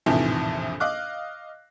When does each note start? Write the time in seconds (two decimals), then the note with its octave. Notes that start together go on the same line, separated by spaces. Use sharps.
0.06 A#1 F2 A2 C3 D#3 E3
0.80 D#5 F5 D6 F#6